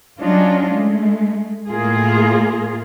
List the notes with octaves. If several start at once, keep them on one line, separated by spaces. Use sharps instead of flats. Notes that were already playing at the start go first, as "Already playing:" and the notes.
F#3 G3 C#4 D4 F4 D#5
G#3 A3
A2 A#3 F4 G#4